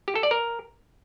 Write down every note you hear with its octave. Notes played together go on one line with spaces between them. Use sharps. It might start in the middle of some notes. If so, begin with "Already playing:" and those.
G4
A4
D5
A#4